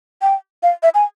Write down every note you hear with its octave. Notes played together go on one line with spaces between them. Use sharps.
G5
F5
E5
G#5